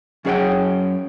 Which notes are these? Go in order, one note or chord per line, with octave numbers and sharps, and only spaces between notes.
F#2 C#4 G#4 C#5 F#5 G5